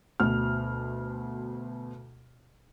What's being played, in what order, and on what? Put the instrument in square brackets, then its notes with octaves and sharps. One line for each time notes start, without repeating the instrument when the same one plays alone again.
[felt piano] D2 B2 F6